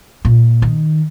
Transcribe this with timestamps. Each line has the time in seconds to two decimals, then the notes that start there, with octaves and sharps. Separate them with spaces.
0.25 A#2
0.62 D#3